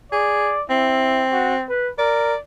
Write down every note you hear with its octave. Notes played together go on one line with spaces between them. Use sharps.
G#4 D5
C4 E4
F#4
B4
A#4 D5